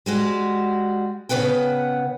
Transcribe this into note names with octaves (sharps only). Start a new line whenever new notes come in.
G3 G#3 F#4
C#3 B3 B4 F#5 G5